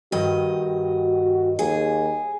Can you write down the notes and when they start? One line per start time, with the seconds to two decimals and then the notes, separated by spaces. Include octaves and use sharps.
0.12 G2 D#3 F#4 D#5
1.59 D#2 G#4